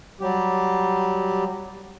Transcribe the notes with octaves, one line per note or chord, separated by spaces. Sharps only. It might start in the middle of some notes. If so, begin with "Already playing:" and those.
F#3 G3 G4